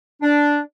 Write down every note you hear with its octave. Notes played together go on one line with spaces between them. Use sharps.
D4